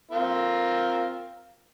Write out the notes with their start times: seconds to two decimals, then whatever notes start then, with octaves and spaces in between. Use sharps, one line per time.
0.11 C4 F4 A#4